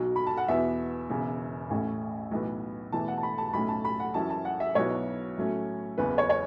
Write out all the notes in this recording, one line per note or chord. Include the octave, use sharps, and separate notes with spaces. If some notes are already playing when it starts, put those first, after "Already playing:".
Already playing: B1 B2 F#3
B5
A5
F#5
E2 B2 B3 E4 E5
E1 E2 C#3
A1 A2 A3 C#4
B1 A2 E3 B3
E1 E2 E3 A3 E4 A5
F#5
A5
B5
A5
A5
B1 A2 A3 C#4 B5
A5
B5
F#5
F#2 E3 C#4 E4 A5
A5
F#5
E5
B1 B2 F#3 B3 E4 C#5
A2 F#3 A3 C#4
F#1 E2 C#3 E3 B4
C#5
C#5